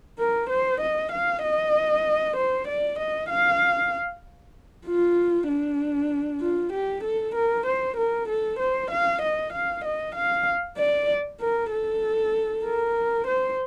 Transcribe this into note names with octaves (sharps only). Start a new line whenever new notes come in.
A#4
C5
D#5
F5
D#5
C5
D5
D#5
F5
F4
D4
F4
G4
A4
A#4
C5
A#4
A4
C5
F5
D#5
F5
D#5
F5
D5
A#4
A4
A#4
C5